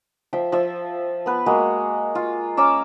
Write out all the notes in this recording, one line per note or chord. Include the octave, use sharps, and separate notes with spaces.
F3 E5 G5
F3 E5
B3 B4
G#3 A#3 F#4
F4
C#4 A#5 D6 E6